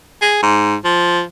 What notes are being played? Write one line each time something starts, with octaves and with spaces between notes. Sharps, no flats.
G#4
G#2
F3